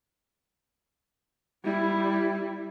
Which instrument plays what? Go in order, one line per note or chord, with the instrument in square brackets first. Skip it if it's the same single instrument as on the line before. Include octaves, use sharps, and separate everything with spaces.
[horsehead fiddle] G3 E4